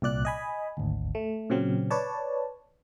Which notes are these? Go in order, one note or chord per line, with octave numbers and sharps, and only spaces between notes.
C2 A#2 D5 F#6
D#5 G#5 B5
G#1 D2
A3
A#2 C#3 F#3 C4
B4 C#5 D5 A5